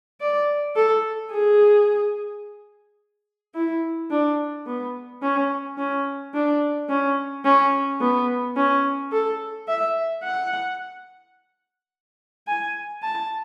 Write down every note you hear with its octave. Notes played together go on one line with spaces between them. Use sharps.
D5
A4
G#4
E4
D4
B3
C#4
C#4
D4
C#4
C#4
B3
C#4
A4
E5
F#5
G#5
A5